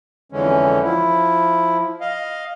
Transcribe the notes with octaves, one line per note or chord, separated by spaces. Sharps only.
F2 D3 E3 G#3 C#4
F3 E4
D#5 F5